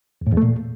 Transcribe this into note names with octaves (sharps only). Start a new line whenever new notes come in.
E2
A2
E2
A3
A#2